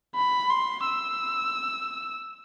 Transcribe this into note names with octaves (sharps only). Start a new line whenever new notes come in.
B5
C6
E6